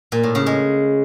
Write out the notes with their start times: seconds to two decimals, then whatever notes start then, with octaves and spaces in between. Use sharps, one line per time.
0.12 A#2
0.23 A2
0.35 C#3
0.46 G#3